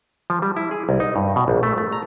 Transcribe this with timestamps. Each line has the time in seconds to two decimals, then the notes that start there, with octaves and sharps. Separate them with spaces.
0.30 F3
0.42 G3
0.56 E4
0.71 G#4
0.89 C2
1.00 D#4
1.16 G2
1.36 B2
1.48 A#1
1.63 A3
1.78 A3
1.92 A#5